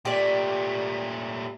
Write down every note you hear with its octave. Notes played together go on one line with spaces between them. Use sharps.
A#2 A3 G4 D5